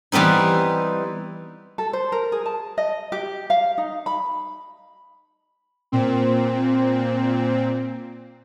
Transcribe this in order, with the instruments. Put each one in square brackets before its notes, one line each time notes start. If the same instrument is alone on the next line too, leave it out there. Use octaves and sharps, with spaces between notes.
[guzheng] E3 G3 B3 C4 D#4
[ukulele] A4
C5
A#4
G#4
A5
D#5
G4
F5
D#4
B5
[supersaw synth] A#2 C4